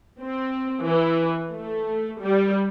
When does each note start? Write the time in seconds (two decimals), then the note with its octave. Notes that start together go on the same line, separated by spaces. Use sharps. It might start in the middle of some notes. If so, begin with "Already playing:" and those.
0.21 C4
0.82 E3
1.52 A3
2.21 G3